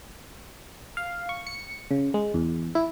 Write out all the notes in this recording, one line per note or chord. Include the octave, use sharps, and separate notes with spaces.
F5
C#6
C#7
C#3
G#3
E2
E4